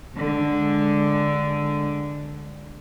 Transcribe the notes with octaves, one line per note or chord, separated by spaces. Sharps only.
D3 G#3